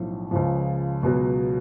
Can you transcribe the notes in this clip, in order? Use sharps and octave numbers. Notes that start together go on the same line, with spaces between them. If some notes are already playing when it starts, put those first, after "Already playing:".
Already playing: B1 A2 F3
C#2 C#3 F3
C#2 B2 F#3 B3